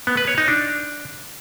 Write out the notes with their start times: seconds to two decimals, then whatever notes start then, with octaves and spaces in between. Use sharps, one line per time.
0.07 B3
0.17 B4
0.27 C#5
0.38 D#4
0.48 D4